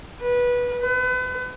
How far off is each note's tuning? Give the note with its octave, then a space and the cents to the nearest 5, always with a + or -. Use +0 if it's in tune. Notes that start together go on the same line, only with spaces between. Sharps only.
B4 -15
B4 +35